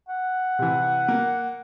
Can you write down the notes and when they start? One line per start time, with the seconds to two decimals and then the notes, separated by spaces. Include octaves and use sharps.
0.09 F#5
0.59 C3 E3
1.08 A#3